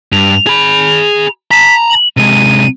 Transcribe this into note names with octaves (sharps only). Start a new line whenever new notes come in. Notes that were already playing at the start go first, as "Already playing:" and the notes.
G2 F7
G#4 B5
A5 A#5 B6
F#7
C3 G#3 D#7